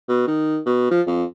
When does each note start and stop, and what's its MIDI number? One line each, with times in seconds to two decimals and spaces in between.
0.09 0.25 47
0.28 0.58 51
0.66 0.88 47
0.91 1.01 53
1.07 1.24 41